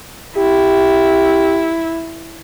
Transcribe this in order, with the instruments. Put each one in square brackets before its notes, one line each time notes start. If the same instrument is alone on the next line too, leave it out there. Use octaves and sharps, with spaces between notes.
[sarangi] E4 [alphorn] G4